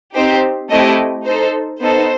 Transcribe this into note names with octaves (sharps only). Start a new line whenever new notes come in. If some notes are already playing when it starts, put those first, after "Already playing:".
C4 D#4 G4 C5
A3 C4 E4 G4 D#5
D#4 A4 C5
B3 D#4 A4 C5